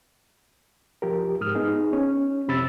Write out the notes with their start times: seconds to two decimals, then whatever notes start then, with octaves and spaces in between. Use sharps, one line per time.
1.02 C2 F3 G4 A#4
1.41 G#2 D#6 F6
1.55 B3 D#4 G#4
1.93 C#4
2.48 F2 C3 B5 E6 A6